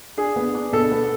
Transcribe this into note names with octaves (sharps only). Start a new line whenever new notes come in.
D4 G#4
B3
D4
B2 A4
B3